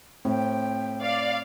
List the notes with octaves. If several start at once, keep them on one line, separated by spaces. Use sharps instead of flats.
A2 C4 G5
D5 F5